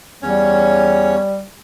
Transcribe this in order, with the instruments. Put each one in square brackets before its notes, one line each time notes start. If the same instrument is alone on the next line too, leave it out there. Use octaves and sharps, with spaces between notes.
[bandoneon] E2 C#4 C#5 [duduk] G3